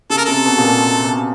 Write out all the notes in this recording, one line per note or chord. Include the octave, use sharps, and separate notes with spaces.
C#3 A4
A#4
C3 A4
B2
A#2
B2
B2